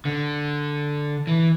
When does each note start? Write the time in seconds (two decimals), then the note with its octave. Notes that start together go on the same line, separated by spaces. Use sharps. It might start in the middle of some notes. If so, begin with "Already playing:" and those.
0.05 D3
1.27 E3